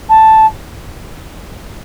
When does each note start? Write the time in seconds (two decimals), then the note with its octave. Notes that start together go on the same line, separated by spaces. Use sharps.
0.09 A5